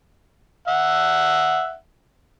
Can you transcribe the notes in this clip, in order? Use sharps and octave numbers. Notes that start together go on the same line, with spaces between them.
E5 F#5